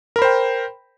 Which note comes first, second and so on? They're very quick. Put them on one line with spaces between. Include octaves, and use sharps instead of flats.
A#4 B5 C5 G5